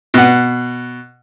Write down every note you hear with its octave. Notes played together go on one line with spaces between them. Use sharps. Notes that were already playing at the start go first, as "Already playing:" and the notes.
B2 F#5